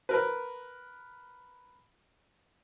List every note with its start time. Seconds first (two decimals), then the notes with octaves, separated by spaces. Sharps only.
0.09 A#4 B4